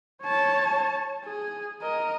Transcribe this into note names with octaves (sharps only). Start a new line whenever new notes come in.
C#5 A5
G#4
A#4 D#5